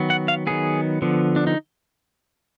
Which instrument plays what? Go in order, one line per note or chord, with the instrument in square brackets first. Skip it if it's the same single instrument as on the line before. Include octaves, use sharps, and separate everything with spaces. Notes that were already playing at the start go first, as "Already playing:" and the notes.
Already playing: [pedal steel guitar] D#3 F#3 B3
F#5
F5
D#3 F#3 B3 G#4
D3 F3 B3
D4
D#4